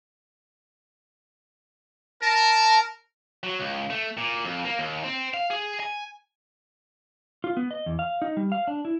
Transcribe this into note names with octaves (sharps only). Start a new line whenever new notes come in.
A#4 A5
F#3
C#2
A3
A#2
F2
A#3
D#2
C4
F5
G#4
G#5
F4
B3
D#5
E2
F5
D#4
G3
F5
D4
E4